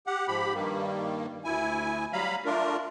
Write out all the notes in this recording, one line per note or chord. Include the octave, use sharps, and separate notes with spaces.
G4 F#5
G#2 F3 G4 B5
G2 D#3 G3 A#3
D2 E4 G#5
F#3 G3 F5 A#5 B5
A3 D4 F4 A#4